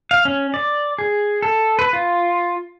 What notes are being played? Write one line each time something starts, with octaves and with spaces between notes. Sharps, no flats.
F5
C#4
D5
G#4
A4
B4
F4